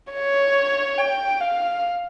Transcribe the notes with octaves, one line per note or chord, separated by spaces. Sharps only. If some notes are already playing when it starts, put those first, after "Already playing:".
C#5
G5
F5